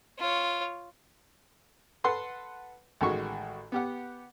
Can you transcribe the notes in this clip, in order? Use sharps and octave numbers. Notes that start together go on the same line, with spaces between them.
F4 C#5
A4 B4 F#5 C6
A1 D#3 G#3 F#4 C#6
B3 G4 F#5